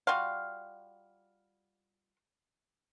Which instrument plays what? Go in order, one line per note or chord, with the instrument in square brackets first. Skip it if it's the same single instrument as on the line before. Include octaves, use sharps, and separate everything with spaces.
[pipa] G3 F4 F#4 F5